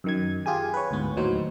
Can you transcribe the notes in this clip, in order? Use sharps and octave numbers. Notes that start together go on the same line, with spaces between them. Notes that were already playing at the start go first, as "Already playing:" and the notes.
F#2 D#3 G#6
F4 G4 G#4 G#5
B4 C#5
D2 G#2 B3
D#2 A2 F#3 D#4 C5